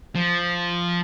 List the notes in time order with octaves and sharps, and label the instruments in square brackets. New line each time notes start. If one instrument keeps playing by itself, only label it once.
[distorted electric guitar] F3